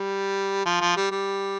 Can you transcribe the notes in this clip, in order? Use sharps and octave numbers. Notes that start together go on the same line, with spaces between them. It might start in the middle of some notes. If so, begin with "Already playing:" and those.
Already playing: G3
F3
F3
G3
G3